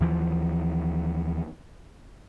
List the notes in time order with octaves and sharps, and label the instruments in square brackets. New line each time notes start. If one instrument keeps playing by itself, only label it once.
[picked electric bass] D#2 E3 F3